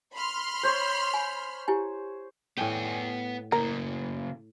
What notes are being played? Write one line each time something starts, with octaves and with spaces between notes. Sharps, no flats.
B5 C6 F6
C5 C#5
G#5
E4 G4 G#5
A2 B3 G5 G#5
C#3 A#3 A#4